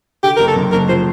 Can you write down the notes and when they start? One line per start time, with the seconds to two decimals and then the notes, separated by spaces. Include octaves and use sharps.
0.23 D3 G4
0.37 F#1 A#4
0.48 A4
0.56 F#2
0.72 F#1 A#4
0.88 F3 C5